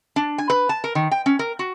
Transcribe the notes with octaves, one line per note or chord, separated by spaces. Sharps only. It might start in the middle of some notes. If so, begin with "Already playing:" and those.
D4
G#5
B4
A5
A#4
D#3
G5
C#4
A#4
F#4